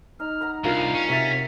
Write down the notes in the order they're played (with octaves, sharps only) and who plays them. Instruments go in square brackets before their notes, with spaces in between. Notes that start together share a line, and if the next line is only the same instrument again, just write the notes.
[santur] D#4 [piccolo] F6
[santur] F#5 A#5 B5
[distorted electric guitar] C2 [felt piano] D4 F4 [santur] A#4 [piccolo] F5
[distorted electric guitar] C#4
[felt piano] C3 A6 [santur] F#4 E5 [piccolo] B6